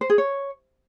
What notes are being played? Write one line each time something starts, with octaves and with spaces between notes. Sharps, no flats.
C5
G#4
C#5